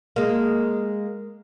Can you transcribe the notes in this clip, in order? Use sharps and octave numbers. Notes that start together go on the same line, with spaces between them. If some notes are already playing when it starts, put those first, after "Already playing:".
G#3 A#3